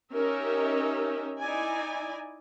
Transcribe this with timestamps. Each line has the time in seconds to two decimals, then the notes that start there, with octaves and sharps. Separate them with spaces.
0.12 C#4 D#4 G4 A#4 E5
1.39 D#4 E4 D5 G#5